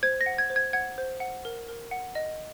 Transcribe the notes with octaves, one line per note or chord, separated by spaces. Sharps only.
C5 G#6
A#6
F#5
G#6
C5
G#6
F#5 G#6
C5
F#5
A#4
A#4
F#5
D#5